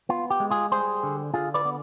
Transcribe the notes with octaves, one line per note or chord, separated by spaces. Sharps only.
B3 F4
G4
G#3
F4 G#4
G3 G#4 C5
D3
D3 F4 G#4
B4 D5
B3